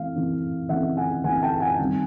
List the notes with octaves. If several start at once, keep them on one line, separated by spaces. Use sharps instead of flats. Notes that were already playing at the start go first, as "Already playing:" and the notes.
Already playing: E3 A3 C4 F5
E3 A3 C4
E3 A3 C4 E5 F#5
F#5 G#5
E3 A3 C4 F#5 G#5
G5 A5
F#5 G#5
D#3 G3 C4